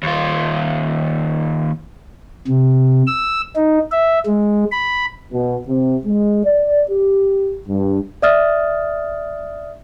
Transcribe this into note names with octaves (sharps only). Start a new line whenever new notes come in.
D#2 F4
C3
E6
D#4
E5
G#3
B5
B2
C3
G#3
D5
G4
G2
D5 E5 D#6 F6 A6